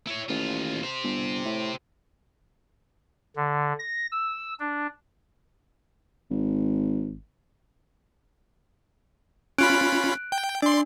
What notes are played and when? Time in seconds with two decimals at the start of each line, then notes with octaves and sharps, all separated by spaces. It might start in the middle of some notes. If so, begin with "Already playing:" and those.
0.07 E4 C#5
0.29 A1 D#2 F4
0.84 G4 C5
1.04 G1
1.45 A2
3.37 D3
3.79 A#6
4.12 E6
4.60 D4
6.31 G#1
9.58 C#4 F4 B5 F#6 D7
10.32 G5
10.62 D4 D5 C6